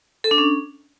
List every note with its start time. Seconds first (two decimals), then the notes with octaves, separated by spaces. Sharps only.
0.24 A4
0.31 D4
0.38 C#4